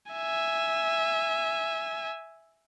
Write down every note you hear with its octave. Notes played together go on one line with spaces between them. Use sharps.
E5 G#5